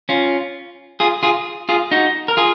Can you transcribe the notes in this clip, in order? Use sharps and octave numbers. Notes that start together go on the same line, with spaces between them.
C#4 F4
F4 G#4
F4 G#4
F4 G#4
D#4 F#4
A#4
F4 G#4